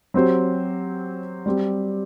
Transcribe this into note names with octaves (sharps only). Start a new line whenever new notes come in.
F#3 C4 G4 C5
G3 C4 G4